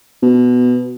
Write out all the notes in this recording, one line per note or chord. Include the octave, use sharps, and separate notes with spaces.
B2